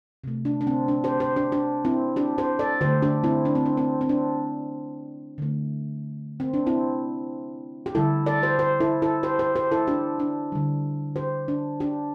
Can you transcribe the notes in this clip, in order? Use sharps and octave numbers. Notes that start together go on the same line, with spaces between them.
C3 A3
D4
D4
C4
D4
G4 C5
G4 C5
D4 G4
D4 G4
C4 E4
D4 G4
G4 C5
A4 D5
D3 A3 G4 C5
D4 G4
C4 E4
D4
C4
D4
C4
C4
D4
D3 A3
C4
D4
C4 E4
G4
D3 G3 E4 A4
A4 D5
G4 C5
G4 C5
E4 A4
E4 A4
G4 C5
G4 C5
G4 C5
E4 A4
D4 G4
D4
D3 G3
G4 C5
D4
D4 G4